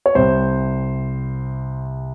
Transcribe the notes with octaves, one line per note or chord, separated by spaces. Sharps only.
C#5
C2 C3 G3 C5